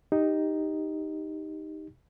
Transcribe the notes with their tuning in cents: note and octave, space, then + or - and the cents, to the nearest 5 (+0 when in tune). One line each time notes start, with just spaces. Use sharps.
D#4 +0 G4 +10